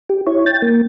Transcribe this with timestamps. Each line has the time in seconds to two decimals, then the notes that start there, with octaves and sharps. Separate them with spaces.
0.10 G4
0.27 E4 C#5
0.46 G5 A6
0.62 A#3